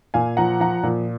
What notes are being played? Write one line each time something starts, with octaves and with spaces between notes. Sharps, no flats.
A#2 F5 G#5
F3 F#5 A#5
F3 F#5 A#5
A#2